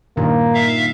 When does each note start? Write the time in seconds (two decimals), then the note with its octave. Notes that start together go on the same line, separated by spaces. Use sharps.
0.17 G2 A#2 D#3 A#3
0.54 E5 F5